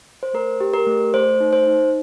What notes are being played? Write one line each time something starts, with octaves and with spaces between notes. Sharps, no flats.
C5
A3 A#4
G4
A#4
A3
A3 C5
D#4
C5
D#4